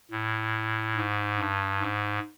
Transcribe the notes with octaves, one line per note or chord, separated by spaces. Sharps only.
A2
G#2
G2
G#2